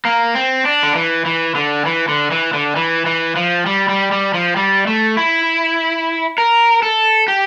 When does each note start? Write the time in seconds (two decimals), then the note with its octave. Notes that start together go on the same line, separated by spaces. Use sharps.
0.05 A#3
0.35 C4
0.65 D4
0.83 D3
0.95 E3
1.26 E3
1.55 D3
1.86 E3
2.08 D3
2.31 E3
2.53 D3
2.76 E3
3.06 E3
3.36 F3
3.66 G3
3.89 G3
4.12 G3
4.34 F3
4.57 G3
4.87 A3
5.17 E4
6.38 A#4
6.83 A4
7.28 G4